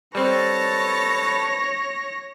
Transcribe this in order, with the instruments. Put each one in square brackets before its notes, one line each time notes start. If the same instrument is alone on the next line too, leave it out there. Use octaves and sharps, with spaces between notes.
[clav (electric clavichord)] G3 C4 [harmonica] A4 B4 A5 [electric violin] C#5 A#6